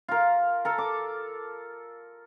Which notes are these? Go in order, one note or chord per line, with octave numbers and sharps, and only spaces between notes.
F4 A#4
A4 A#4
D6